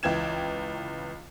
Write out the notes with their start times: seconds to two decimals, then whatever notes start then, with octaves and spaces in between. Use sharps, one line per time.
0.03 C#2 E3 G5 G#6 E7